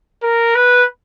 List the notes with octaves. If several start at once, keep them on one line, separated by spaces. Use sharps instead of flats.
A#4
B4